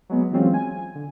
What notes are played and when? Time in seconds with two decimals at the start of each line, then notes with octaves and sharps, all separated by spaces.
0.09 F#3 G#3 B3
0.31 E3 F#3 G#3 C4 C#4 F4
0.54 G#5
0.95 D3